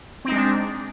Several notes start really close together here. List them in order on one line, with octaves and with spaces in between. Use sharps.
C4 D#4 G#3 D4